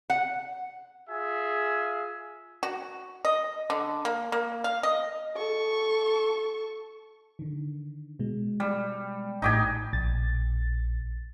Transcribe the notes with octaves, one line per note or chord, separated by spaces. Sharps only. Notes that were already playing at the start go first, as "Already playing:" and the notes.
F#5
F4 G#4 E5 G#5
F#4
D#5
D3
A#3
A#3
F5
D#5
A4 C#6
D3 D#3
B2 G#3
G3
A1 A2 D#4 G4 G#5
A#1 A6